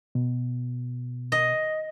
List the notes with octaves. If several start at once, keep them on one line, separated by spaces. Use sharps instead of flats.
B2
D#5